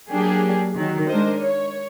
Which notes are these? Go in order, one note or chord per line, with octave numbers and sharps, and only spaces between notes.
F#3 A#3 D4 G4 G#4
D#3 F#3
G#3 D4 A#4 C5 D#5
C#5